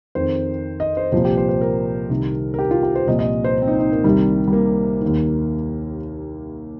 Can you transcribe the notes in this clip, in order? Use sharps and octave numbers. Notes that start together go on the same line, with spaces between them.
F2 D#3 C5
D#5
C5
C2 A#2 F3 C5
G4
C5
C5
A#4
C2 C3 D#3
A#4
G4
F4
G4
C5
C2 A#2 F3 D#5
D#5
C5
C4
D#4
D#4
A#3
C2 C3 D#3 G3
G3
A#3
D#2 D#3